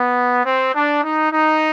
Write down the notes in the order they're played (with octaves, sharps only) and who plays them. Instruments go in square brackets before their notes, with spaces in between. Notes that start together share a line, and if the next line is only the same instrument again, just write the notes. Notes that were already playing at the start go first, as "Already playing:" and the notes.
Already playing: [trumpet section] B3
C4
D4
D#4
D#4